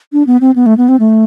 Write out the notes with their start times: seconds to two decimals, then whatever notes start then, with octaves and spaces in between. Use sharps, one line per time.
0.13 D4
0.27 B3
0.41 C4
0.56 B3
0.66 A3
0.78 B3
0.88 C4
1.00 A3